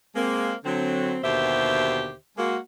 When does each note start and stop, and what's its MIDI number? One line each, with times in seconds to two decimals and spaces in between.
0.16 0.54 56
0.16 0.54 58
0.16 0.54 60
0.64 1.18 50
0.64 1.18 54
0.64 1.18 60
1.24 2.14 39
1.24 2.14 47
1.24 2.14 50
1.24 2.14 67
1.24 2.14 72
1.24 2.14 76
2.38 2.57 56
2.38 2.57 58
2.38 2.57 66